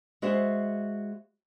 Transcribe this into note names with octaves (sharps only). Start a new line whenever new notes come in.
G#3 F#4 C5 E5 F5